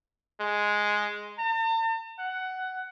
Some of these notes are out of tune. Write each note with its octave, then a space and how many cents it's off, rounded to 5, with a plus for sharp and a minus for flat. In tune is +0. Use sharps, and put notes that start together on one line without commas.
G#3 +0
A5 +45
F#5 +15